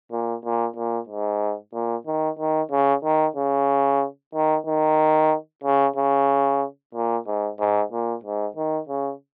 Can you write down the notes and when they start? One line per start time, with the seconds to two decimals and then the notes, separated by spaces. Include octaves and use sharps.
0.12 A#2
0.45 A#2
0.76 A#2
1.09 G#2
1.73 A#2
2.07 D#3
2.39 D#3
2.71 C#3
3.04 D#3
3.36 C#3
4.35 D#3
4.67 D#3
5.64 C#3
5.96 C#3
6.95 A#2
7.26 G#2
7.59 G#2
7.92 A#2
8.24 G#2
8.57 D#3
8.89 C#3